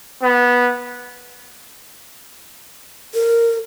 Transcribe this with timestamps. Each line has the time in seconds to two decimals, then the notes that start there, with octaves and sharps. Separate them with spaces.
0.23 B3
3.14 A#4